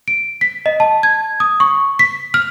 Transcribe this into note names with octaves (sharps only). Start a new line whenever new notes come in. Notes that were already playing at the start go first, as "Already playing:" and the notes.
D7
B6
D#5
A5
G#6
D#6
C#6
B6
F6